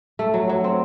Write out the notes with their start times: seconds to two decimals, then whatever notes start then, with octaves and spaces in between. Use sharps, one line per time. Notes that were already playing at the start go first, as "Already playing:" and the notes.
0.19 A3
0.34 F#3
0.49 F#3
0.64 C4